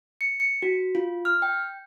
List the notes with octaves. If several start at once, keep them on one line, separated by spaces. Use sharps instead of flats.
C#7
C#7
F#4
F4
F6
G5